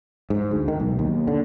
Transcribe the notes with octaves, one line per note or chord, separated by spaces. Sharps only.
G#2
D2
D#3
B1
D#2
D3